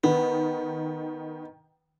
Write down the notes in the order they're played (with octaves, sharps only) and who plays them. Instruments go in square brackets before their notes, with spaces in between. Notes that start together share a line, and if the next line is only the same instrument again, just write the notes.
[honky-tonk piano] D#3 [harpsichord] B3